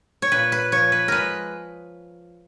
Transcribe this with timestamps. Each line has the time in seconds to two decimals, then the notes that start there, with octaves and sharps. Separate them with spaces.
0.22 C#5
0.32 A#2 B4
0.52 B4
0.72 F3 C#5
0.92 B4
1.08 G#3 A#4 B4